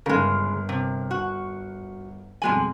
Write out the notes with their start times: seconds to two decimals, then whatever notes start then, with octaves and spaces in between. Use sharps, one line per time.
0.06 G1 C#3 G#3 A#4
0.69 C3
1.11 F#4
2.42 F2 B2 G3 G#3 G#5 F#7